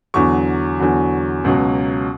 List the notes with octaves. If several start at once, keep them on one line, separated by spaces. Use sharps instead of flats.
E2 D3 F#3 C#6
E2 D3 F#3
C#2 B2 F#3